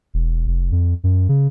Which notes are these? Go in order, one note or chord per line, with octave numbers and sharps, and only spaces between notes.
E1
F1
F2
F#2
C#3